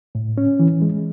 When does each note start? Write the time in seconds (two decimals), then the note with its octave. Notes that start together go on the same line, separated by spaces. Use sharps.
0.15 A2
0.38 C#4
0.60 E3
0.82 G#3